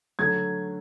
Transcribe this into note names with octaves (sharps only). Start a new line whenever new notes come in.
D3 F#3 A3 G#6